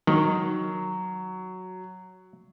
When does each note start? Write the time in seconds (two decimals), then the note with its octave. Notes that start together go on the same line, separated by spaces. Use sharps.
0.07 D#3 F#3